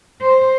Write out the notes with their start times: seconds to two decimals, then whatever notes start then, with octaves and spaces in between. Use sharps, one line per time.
0.21 C5